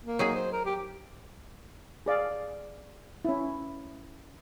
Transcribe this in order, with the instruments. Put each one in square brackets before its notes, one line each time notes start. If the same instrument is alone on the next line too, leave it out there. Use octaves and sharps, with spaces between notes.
[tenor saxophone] A#3
[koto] F#3 D#4 G#4
[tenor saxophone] C5
A#4
G4
[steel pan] G#4 D5 F5
C#4 E4